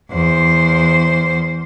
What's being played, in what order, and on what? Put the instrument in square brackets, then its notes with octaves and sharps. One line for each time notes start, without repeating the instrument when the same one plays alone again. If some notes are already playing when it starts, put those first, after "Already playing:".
[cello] E2 C5